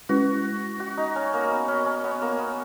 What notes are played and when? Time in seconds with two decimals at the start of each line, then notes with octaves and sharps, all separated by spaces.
0.09 G#3 C#4 E4 F#4 B4
0.80 F#4
0.97 D#4
1.16 C#4
1.33 A#3
1.51 B3
1.68 C#4
1.86 C#4
2.04 B3
2.22 A#3
2.39 B3